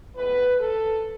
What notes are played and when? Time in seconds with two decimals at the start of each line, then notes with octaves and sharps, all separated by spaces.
0.15 A2 G#3 B3 B4
0.60 A4